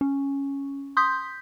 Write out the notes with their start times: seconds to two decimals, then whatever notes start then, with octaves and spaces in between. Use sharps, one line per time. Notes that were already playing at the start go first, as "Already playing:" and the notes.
0.01 C#4
0.97 C6 D#6 G6 B6